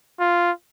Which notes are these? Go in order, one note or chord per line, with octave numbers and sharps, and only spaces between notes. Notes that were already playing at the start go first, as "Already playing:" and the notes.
F4